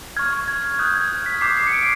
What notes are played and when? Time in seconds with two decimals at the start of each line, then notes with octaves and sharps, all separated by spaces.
0.17 C#6 F6 G#6
0.33 G#6
0.48 G#6
0.63 G#6
0.79 D#6 F#6 G6
0.96 G#6
1.26 B6
1.41 D6 G6 C7
1.57 C7
1.67 C#7
1.73 D7